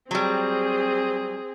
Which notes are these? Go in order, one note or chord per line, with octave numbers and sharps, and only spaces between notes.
F#3 G3 C4 G#4